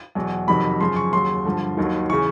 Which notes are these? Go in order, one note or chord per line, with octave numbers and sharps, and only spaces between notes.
E2 B2 F#3
F2 C3 D#3 F#3 B5
F#2 C#3 F3 C6
C#6
D#2 C#3 F#3 C6
G2 D3 F3
D#2 D#3 F#3
C#3 E3 C#6